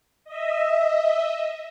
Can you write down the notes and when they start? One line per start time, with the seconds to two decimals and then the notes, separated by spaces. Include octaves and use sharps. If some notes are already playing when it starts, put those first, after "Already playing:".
0.25 D#5 E5